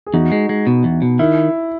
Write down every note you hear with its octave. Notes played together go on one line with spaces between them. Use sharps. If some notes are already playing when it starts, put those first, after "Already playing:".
G#4
E2 D#4 F#4
G#3
G#3
B2
E2
B2
D#3 E4